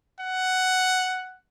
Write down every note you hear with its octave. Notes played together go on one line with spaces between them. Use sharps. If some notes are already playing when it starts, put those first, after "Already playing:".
F#5